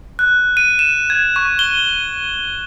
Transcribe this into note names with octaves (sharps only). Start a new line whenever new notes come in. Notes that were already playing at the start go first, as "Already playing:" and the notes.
F#6
D#7
E7
G#6
C#6
G7